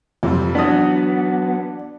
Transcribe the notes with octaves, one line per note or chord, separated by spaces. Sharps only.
F2 C3 F3 G3
E3 F#3 B3 D4 D5 D#6